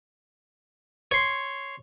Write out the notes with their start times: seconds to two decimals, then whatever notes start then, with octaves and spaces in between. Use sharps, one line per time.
1.11 C#5 C6